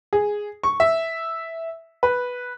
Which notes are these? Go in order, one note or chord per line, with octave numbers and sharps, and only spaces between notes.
G#4
C#6
E5
B4